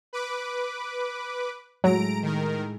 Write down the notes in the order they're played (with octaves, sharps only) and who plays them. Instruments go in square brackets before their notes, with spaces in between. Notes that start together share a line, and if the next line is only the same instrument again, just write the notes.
[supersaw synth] B4 D6
[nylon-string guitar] A2 G#3 [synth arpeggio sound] F#3 [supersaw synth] A#5 D7
[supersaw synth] D#3 A#4